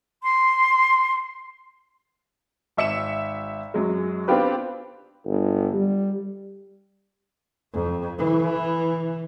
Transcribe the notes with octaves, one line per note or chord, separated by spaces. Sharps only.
C6
G#1 E5 C#7 E7
F#2 F#3 G#3
B3 C4 D4 F4 G4 B4
G1
G3
F2
E3